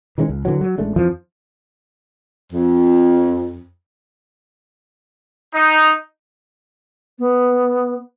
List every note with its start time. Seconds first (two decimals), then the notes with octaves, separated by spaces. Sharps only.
0.18 D#3 E3 G#3 C#4
0.29 C#2
0.45 D3 E3 F#3
0.61 F#3
0.78 A1 G#3 A3 D4
0.96 F2 E3 F3
2.53 F2
5.54 D#4
7.18 B3